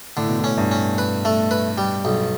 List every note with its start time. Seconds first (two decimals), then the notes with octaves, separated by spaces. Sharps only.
0.17 A2 D3
0.28 B2
0.39 A2
0.44 C#4
0.58 G2
0.71 C#4
0.98 B4
1.25 A3
1.51 B4
1.78 G3
2.05 B1